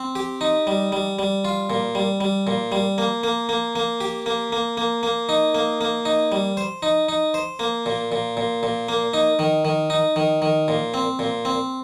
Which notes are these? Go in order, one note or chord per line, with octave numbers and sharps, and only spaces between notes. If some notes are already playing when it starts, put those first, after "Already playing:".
Already playing: C4
G4
D#4
G3
G3
G3
F4
A#2
G3
G3
A#2
G3
A#3
A#3
A#3
A#3
G4
A#3
A#3
A#3
A#3
D#4
A#3
A#3
D#4
G3
C5
D#4
D#4
C5
A#3
A#2
A#2
A#2
A#2
A#3
D#4
D#3
D#3
D#4
D#3
D#3
A#2
C4
A#2
C4